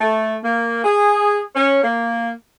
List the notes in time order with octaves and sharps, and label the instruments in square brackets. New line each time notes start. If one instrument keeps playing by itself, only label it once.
[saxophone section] A3
A#3
G#4
C#4
A#3